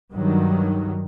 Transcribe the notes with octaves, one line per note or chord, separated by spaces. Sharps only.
G2 D#3 F#3